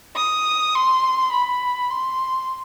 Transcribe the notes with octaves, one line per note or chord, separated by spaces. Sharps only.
D#6
C6
B5
C6